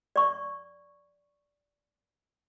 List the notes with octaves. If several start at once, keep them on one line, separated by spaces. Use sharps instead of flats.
D5 C#6